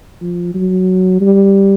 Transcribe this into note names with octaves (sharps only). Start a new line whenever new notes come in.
F3
F#3
G3